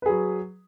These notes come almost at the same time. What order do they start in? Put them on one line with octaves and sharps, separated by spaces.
B4 G#4 F#3